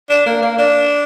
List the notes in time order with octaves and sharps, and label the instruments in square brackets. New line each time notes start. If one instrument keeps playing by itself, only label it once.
[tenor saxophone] D4
A#3
A#3
D4